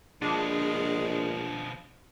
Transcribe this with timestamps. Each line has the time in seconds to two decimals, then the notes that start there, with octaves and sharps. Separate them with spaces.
0.22 A#1 B2 F3 G#3 D4